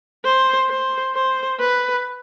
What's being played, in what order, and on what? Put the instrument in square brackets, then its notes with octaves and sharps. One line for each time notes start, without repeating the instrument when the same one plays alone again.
[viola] C5
C5
C5
B4